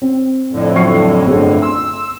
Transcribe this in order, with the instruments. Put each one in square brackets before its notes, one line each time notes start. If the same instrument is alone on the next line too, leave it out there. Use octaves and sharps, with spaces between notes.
[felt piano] C4
[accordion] F2 A2 D3
[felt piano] F#3 C#6 C7
G1 A3 G#4
[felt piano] C6 [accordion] E6